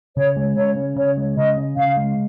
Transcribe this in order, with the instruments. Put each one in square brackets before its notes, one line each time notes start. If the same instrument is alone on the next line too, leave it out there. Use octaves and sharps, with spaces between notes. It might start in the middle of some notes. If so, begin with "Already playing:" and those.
[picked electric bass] C#3 [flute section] C#5
[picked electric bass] G#3
[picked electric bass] C#3 [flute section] C#5
[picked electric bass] C#4
[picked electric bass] C#3 [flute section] C#5
[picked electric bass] G#3
[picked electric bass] C#3 [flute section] D#5
[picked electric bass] C#4
[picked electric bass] C#3 [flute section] F5
[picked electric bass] G#3